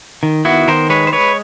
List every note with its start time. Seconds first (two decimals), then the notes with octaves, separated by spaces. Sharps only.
0.23 D#3
0.45 B3 E4 F#4
0.68 D#3 A#4 C5
0.90 G#3 B4 C#5
1.07 C5
1.12 G#3 B4 C#5